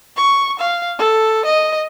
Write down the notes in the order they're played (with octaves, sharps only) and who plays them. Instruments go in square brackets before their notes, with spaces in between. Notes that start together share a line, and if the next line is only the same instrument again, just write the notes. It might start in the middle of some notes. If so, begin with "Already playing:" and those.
[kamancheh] C#6
F5
A4
D#5